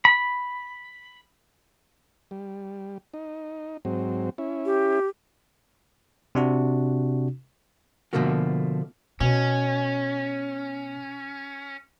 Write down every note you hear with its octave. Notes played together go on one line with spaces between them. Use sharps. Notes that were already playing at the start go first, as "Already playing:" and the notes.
B5
G3
D#4
G#2 F#3 C4
C#4 E4
G4
C3 D4 F#4
B2 D3 F3 A3 A#3 F#4
B2 C#4